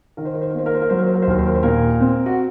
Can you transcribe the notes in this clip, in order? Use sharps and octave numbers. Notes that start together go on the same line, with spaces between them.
D#3 A#4
C5
A#4
C5
A#4
A#3 C5
A#4
C5
A#4
F#3 C5
A#4
C5
A#4
C5
D#2 A#4
C5
A#4
C5
A#2 A#4
C4
F#4